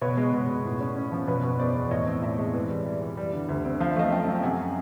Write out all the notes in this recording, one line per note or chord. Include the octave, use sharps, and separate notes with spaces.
B2 B4 C#5
G#3
B2
B2
A2
C#4
C#4
F3
B2 B4 C#5
B2
E2 C5 D5
E2
A2 C#5 D#5
C4
A2 D5 E5
G#3
E3
G3
G3
E3
G3
D3
D2
C4
F3 F5
E5
A3 D#5 F5
F#2 F5 G5
F#2
C3 F#5 G#5